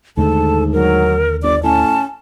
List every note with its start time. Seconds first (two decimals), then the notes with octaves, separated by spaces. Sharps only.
0.17 D#2 G#2 D3 A3 A4 A5
0.73 F#3 A#4
1.43 G1 D5 D6
1.63 A2 C#4 A5